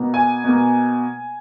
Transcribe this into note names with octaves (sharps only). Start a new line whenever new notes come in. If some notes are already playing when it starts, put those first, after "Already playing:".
Already playing: B2 A#3
G#5
B2 A#3